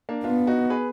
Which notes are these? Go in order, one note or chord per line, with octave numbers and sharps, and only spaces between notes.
A#3 D4
B3 D4 F4
D#4 F#4
G#4 B4